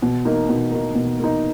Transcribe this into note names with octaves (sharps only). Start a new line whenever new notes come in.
B2
A#3 D#4
B2
A#3 D#4
B2
A#3 D#4